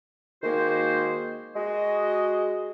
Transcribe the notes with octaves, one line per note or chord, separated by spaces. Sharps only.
D#3 G#3 A#3 F#4 C5
G#3 F#4 D#5